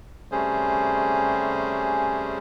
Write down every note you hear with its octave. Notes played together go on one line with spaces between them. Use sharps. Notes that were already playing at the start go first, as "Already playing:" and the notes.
C3 G3 A3 C#4 G#4 C5